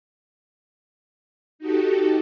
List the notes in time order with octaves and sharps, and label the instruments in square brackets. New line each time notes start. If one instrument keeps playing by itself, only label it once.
[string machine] D#4 F#4 G4 A4